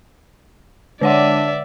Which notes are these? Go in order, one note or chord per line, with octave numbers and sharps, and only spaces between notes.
D3 D4 C#5 D5 E5 F#5